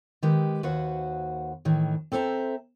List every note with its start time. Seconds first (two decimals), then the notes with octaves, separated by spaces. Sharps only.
0.22 D#3 G#3 G4 B4
0.63 D#2 F#4 B4 C5 F5 F#5
1.65 A2 D#3 E3
2.12 C4 A4 C5 E5 A#5